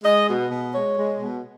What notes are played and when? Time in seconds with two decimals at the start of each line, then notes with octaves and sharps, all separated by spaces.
0.03 G#3 D#5
0.27 B2
0.50 B2
0.73 G#3 C#5
0.96 G#3
1.20 B2